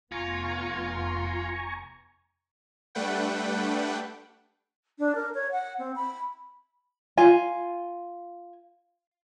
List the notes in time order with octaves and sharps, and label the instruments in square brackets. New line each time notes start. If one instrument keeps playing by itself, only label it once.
[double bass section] F1 B3 [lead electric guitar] F4 [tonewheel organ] G#5 A#5 C#6
[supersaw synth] G3 A3 D4 B4 F#5 G5
[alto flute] D4
A#4
C#5
F#5
C4
B5
[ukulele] F4 G#5